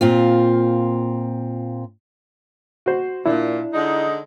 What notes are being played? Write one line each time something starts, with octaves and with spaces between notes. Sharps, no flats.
A#2 C4 F4
F#4 C5
A#2 D4 E4
D3 G#3 D#4